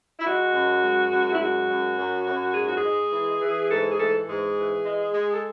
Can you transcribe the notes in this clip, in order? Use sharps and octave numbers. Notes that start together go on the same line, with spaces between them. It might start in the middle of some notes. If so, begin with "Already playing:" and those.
E4
G#3 F#4
F#2
G#3
F#2
E4
G#3 F#4
F#2
F#2
F#2
G#2 G#4
F#4
G#4
G#3
E3
E3
G#2 A4
G#4
E3 A4
G#2 G#4
E3
G#3
G#3
A4